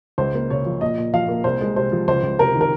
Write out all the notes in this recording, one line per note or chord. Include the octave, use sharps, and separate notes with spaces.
C#2 C5
A#3
C#3 C#5
F3
A#2 D#5
A#2
F3 F5
A#3
C2 C5
G#3
C3 C5
F3
C#2 C5
C#2
C3 A#4
D#3
A#4